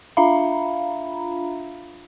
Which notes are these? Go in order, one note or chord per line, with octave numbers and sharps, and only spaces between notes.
D4 F4 E5 F5 A#5 B5